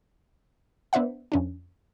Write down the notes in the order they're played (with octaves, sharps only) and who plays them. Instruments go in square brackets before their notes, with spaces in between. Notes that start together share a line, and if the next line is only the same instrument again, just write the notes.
[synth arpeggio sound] B3 D4 C5 E5 F#5
F2 C#4 D4